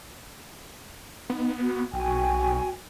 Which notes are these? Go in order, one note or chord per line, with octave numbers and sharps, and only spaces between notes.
B3 D#4
F#4
B1 F#4 G5 G#5